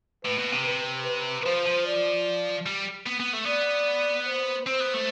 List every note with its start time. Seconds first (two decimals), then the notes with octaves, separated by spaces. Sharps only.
0.25 A2 B4
0.38 B2
0.52 C3
0.66 B4
1.06 B4
1.45 F3 C5
1.66 F3
1.86 D5
2.66 G3
3.06 B3
3.20 B3
3.33 A3
3.46 B3 D5
4.27 C5
4.66 C4 C5
4.80 B3
4.94 A3